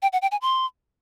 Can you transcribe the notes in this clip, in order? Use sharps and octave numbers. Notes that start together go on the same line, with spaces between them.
G5
F#5
G5
G#5
C6